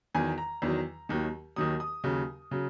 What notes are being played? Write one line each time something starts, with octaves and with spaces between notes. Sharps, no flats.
E2 D#3 F#3 G#5
A#5
E2 D#3 F#3
D#2 D#3 F#3
D#2 D#3 F#3 D#6
D#6
D#2 C#3 F#3
C#3 F#3